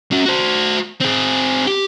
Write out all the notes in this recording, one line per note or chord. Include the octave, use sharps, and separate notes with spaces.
C#4 F#4
F#4 C5
C4 G#4
G4